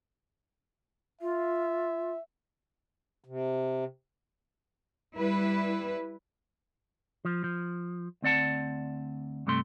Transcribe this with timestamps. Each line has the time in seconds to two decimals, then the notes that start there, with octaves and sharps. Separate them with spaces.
1.21 F4 E5
3.24 C3
5.17 G3 E4 B4
7.25 F3
7.44 F3
8.22 D2 C4 D5 F#5 A5
9.47 G2 C3 A3 C6